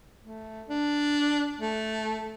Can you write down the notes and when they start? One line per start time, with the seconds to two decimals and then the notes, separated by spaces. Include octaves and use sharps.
0.23 A3
0.69 D4
1.60 A3